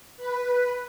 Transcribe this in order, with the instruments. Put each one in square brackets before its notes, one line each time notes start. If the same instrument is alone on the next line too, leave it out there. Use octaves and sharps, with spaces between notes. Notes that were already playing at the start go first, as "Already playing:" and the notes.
[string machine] B4